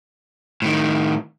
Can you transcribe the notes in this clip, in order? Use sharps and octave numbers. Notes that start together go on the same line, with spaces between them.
A2 D#3